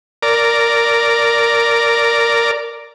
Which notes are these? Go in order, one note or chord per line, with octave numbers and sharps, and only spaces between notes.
A#4 D5